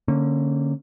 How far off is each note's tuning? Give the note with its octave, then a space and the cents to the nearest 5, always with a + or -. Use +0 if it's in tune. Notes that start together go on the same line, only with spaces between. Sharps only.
D3 +0 A#3 -20 C#4 -25